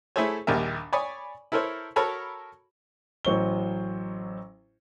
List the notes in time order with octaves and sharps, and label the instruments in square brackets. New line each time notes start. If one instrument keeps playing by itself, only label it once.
[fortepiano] A3 E4 G#4 A4 C5 C#5
A#1 D#2 G3 A#4 E5
C#5 D5 G#5 B5 C#6 D#6
E4 A4 A#4 C5 C#5
F#4 A4 A#4 C#5 A5 B5
[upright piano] A1 F#3 C5 C#6 G7